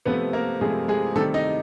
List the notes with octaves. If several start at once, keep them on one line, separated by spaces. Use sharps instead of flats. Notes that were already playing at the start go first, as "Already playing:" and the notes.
C3 F3 A3 B3 B4
A#3 A#4
C3 F3 G#3 A3 G#4
G#3 G#4
C3 D#3 G3 A3 A4
D#4 D#5